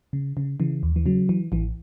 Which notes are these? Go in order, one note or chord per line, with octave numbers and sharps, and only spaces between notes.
C#3
C#3
C#3 E3
D#2
E3
C#3 F#3
E3
A1 E3